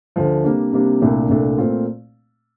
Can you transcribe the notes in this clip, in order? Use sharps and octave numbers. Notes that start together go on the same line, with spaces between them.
D2 D3 F3
C3 G3 A#3 D4
C3 G3 A#3 D4
C2 A#2 A3 D4 A4
C2 A#2 A3 D4 A4
A#2 A3 C4 F4